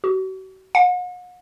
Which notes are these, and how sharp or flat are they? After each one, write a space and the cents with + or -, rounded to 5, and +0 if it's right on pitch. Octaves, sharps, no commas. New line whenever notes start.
F#4 +40
F#5 -45